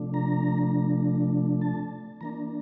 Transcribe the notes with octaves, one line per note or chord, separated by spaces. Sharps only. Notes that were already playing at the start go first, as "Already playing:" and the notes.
Already playing: C3 F3 A3 D4
A#5
A5
E3 A#3 D4 A#5